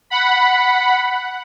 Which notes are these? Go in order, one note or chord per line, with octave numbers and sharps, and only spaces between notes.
F#5 B5